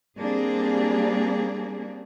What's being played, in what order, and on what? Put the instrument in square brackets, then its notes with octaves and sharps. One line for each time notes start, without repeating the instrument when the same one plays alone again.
[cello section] G3 A#3 C4 D4 G#4